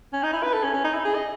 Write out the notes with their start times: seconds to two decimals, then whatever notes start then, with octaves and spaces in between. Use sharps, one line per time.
0.13 C#4
0.23 D#4
0.33 E4
0.43 B4
0.53 A4
0.64 C#4
0.74 C#4
0.84 D#4
0.94 E4
1.05 G#4
1.15 D#5